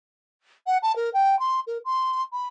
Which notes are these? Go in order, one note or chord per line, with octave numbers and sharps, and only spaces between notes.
F#5
A5
A#4
G5
C6
A#4
C6
B5